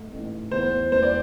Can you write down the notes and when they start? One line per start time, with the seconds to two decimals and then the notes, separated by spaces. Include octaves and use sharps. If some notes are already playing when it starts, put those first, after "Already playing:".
Already playing: G#2 A3
0.12 A1
0.51 E2 C5
0.92 E1 C5
1.03 D5